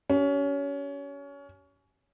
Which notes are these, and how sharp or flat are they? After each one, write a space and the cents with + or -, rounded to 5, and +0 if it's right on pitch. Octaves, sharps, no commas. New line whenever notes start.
C#4 +25 G4 -35